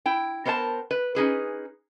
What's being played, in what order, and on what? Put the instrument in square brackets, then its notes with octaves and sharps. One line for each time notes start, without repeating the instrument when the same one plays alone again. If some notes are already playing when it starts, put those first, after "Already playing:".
[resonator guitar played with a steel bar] E4 G5
B3 A#4 C5 D5 A5
B4
C#4 D#4 G#4 B4